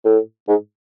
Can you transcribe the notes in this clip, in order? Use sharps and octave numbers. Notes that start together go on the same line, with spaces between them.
A2
G#2